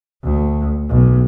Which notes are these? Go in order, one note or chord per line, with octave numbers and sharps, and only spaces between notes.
D2
B1